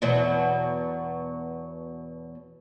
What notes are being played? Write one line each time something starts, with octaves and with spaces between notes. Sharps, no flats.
E2 B2 F#3